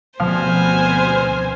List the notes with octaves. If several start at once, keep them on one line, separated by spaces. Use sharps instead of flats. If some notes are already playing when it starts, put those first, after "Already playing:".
D2 B2 F3 B3 C4 C5 G#5 F6